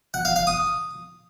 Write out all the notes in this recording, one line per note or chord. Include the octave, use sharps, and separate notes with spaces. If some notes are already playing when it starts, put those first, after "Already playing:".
F#5
F5
F5
D#6